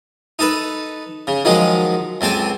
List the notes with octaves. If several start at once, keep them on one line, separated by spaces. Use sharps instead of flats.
D#4 A4 B4
C#3
D#3 F3 F#3 G#3 D#4
C#2 C4 A4 G5 G#5